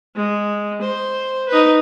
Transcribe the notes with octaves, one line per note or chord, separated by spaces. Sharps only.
G#3
C5
D#4 B4